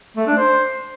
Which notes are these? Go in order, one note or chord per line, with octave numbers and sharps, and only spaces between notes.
A3
D4
C5